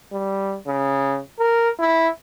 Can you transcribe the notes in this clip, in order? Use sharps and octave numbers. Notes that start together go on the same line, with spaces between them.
G3
C#3
A#4
E4